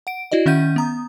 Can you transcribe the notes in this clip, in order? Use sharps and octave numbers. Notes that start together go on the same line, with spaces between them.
F#5 D7
E4 F#4 D5 D#5
D#3 C#4 E5 F#5 G6 D#7
B3 A#5 D#6